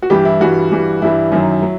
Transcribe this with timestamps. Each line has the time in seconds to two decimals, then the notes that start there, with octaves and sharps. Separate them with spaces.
0.02 F#4
0.10 G2 E3 G3 G4
0.25 E4
0.40 G2 E3 G3 F#4
0.72 G2 E3 G3
1.02 G2 E3 G3 E4
1.32 F#2 D#3 F#3
1.62 F#3